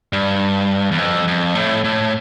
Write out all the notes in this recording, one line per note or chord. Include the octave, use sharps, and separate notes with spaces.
G2
E2
F2
F2
A2
A2